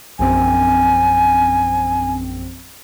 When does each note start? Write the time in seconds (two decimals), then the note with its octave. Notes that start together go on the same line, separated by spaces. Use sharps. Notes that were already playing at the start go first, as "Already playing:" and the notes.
0.19 A#1 F#2 C4 G#5